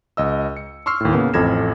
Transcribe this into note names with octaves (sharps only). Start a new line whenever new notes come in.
C#2 D#5 E6
C#7
C6 C#6 E6 F6 C7
D#2 A2
C#3 A#3 B3
A1 F2 A4 G#6 A#6 E7